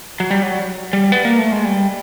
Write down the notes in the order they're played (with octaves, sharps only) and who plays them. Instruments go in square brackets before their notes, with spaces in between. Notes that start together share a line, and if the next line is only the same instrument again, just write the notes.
[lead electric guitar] F#3
G3
F#3
G3
B3
A#3
A3
G#3
G3